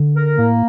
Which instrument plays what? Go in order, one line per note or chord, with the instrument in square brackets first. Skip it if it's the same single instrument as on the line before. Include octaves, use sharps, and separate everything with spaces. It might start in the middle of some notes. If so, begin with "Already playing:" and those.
Already playing: [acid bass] D3
[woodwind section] A#4
[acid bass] A2 [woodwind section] A#3